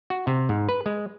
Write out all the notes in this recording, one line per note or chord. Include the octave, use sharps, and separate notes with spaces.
F#4
C3
G#2
B4
G#3